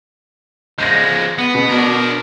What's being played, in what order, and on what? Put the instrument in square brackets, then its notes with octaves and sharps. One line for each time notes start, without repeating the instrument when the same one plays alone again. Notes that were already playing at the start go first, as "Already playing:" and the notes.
[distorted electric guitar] F3 G#3 [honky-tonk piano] G6 A#6
[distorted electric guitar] B3
[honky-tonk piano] B2
[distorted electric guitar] D4 A#4